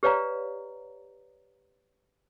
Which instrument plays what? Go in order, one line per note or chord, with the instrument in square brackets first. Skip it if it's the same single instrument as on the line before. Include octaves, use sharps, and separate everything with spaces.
[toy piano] G4 B4 C#5 D5 F5 A#5